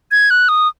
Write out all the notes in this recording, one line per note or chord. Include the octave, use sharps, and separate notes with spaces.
G#6
F#6
D#6